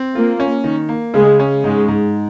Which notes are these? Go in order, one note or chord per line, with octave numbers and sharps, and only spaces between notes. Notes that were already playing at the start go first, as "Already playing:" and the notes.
Already playing: C4
A#3 F4
C#4
D#3
A#3
C#3 G#3
C#4
G#2 G#3
G#2